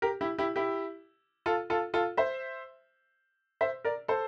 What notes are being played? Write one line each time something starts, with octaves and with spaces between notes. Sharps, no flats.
G4 A#4
E4 G4
E4 G4
E4 G4
F4 A4
F4 A4
F4 A4
C5 E5
C5 E5
A#4 D5
A4 C5